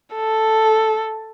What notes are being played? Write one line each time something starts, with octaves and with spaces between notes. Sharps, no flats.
A4